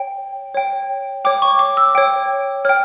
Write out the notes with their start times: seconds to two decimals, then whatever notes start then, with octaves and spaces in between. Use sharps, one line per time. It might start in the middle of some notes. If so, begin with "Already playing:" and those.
Already playing: C#5 G5
0.55 C#5 G5
1.25 C#5 G5 D6
1.42 C#6
1.59 D6
1.77 E6
1.95 C#5 G5
2.65 C#5 G5 F6